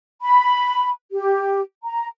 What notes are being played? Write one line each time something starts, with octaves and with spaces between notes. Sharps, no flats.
B5
G4
A#5